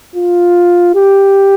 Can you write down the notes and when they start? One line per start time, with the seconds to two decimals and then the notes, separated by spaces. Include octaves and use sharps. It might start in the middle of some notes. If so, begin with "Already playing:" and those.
0.15 F4
0.95 G4